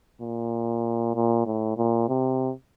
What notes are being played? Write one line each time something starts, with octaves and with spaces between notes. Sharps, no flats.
A#2
A#2
A2
A#2
C3